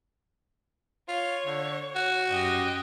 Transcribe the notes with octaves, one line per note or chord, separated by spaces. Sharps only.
F4 C#5
D3
F#4
F#2 G4 D#5